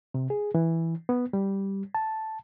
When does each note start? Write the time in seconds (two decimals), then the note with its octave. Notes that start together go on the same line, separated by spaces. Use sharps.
0.14 C3
0.30 G#4
0.55 E3
1.09 B3
1.33 G3
1.95 A5